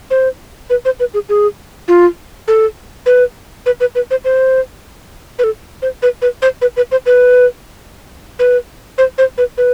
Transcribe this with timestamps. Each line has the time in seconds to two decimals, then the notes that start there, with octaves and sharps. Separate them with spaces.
0.11 C5
0.70 B4
0.85 C5
1.00 B4
1.14 G#4
1.29 G#4
1.88 F4
2.48 A4
3.06 B4
3.66 B4
3.80 B4
3.95 B4
4.11 C5
4.25 C5
5.39 B4
5.44 A4
5.82 C5
6.02 B4
6.22 B4
6.42 C5
6.62 B4
6.77 B4
6.92 C5
7.06 B4
8.39 B4
8.98 C5
9.18 C5
9.38 B4
9.58 B4